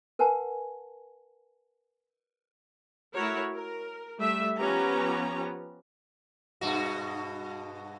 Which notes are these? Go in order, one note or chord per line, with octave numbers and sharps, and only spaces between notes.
A#4 B4 F#5 G#5 A5
A3 E4 F#4 A#4 C#5
A#4
G3 A3 E5
F3 B3 C#4 G4 A#5
G2 B2 F#4